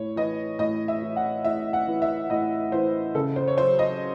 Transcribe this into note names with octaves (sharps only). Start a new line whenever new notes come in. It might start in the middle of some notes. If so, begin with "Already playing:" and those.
Already playing: A2 C#5
E3 D#5
A2 D#5
E5
E3
F#5
A2 E5
F#5
E3
E5
A2 D#5
E3 C5
C#3 A4
C5
C#5
F#3 C5
D#5